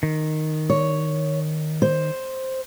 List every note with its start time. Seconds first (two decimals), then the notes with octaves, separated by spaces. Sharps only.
0.03 D#3
0.70 C#5
1.82 C5